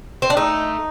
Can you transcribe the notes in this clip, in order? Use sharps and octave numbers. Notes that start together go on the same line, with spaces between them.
C4
D4
A3 D#4